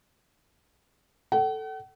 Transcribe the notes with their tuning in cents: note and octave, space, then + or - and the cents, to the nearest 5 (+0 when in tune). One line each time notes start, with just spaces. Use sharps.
A4 +0 F#5 +45